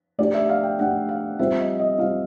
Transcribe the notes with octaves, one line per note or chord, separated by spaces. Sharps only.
A3 D4 G4 D5
E5
F5
G5
A3 D4 G4 F#5
F5
G3 C4 F4 E5
D#5
D#5
G3 C4 F4 F5